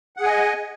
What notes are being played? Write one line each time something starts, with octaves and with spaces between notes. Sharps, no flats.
G#4 D#5 F#5 G#5